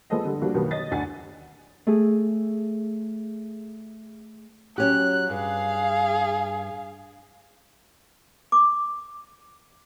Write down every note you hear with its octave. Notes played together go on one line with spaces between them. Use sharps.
F3 G#3 B3 A4 C5 D#5
D3 G3
F3 G3 A#3 D4 F#4
B2 D#3 F#3 G3 A#3 B3
C#5 D#5 A6
D2 D4 F#5 G#5 A6
A3 G#4
F#3 C#4 G4 F#6
G2 G#4 F5
D6